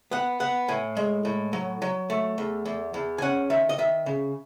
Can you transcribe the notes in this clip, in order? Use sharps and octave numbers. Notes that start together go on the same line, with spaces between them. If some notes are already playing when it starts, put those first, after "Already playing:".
B3 F#5
B3 F#5
A2 G#5
G#3
A2
F#3
F#3
A3
E2
E2
E2
G#5
C#4 F#5
D#3 E5
D#5
D#3 E5
C#3